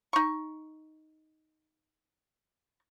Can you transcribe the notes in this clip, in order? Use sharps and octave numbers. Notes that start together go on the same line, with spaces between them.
D#4 C#6